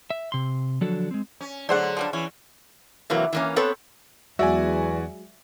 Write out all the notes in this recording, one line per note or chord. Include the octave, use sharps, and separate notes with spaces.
E5
C3 C6
D3 F3 F#3 D4 F#4 A4
G#3 C4
C#4
D3 F#3 G#4 A4 C5 D5 F#5
C6
F3 G3 D4
E3 C#4
C3 E3 F#3 A#3
E3 A#3 C#4
B3 C4 A4 B4 C#5
E2 F#3 G#3 F#4 D5 E5 G#5